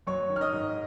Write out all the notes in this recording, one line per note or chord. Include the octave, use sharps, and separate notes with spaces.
F#3 C#5 C#6
D#3
F6
D#5 D#6
G#2